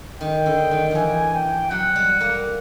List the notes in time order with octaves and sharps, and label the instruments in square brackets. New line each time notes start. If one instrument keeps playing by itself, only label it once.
[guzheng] D#3 [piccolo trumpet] G5
[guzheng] D3
D#3
[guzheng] E3 F3 [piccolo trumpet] G#5
[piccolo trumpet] G5
[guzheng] F#3 [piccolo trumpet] F#5
[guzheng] G3
A#3